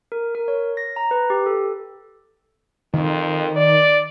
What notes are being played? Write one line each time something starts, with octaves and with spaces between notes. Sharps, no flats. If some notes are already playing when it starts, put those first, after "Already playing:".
A#4
A#4
C#5
A#6
A#5
B4
G4
A4
F2 D#3
D5